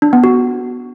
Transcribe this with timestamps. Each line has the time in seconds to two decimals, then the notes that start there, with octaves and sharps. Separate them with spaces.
0.02 D4
0.13 B3
0.24 F#4